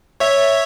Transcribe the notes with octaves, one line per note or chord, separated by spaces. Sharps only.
C#5 E5